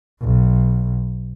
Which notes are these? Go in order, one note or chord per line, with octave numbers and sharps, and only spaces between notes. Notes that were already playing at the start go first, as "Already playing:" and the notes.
B1